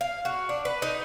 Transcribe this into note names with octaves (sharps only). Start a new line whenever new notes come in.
F5
F#4
D4
B4
D#4